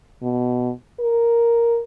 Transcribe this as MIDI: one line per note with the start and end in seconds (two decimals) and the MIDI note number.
0.23 0.71 47
0.99 1.80 70